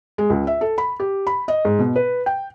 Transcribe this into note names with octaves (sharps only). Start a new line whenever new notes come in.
G#3
C#2
E5
A4
B5
G4
B5
D#5
G#2
B2
B4
G5